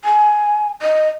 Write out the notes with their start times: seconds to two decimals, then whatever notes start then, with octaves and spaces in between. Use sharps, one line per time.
0.05 G#5
0.82 D#5